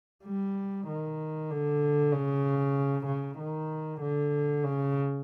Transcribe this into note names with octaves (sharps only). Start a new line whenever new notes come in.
G3
D#3
D3
C#3
C#3
D#3
D3
C#3